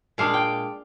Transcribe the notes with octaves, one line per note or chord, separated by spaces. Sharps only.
A#2 G#3 D4 F5
G5